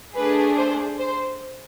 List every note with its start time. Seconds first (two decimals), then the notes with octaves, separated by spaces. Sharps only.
0.15 A3 D4 G#4 B4
0.57 C5
0.99 C5